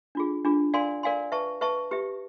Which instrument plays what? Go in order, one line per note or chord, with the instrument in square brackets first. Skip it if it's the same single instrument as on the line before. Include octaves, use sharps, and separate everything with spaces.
[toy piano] D4 F4 G#4
D4 F4 G#4
A#4 D5 F5 G#5 C6
A#4 D5 F5 G#5 C6
B4 E5 A5 C#6
B4 E5 A5 C#6
G4 B4 E5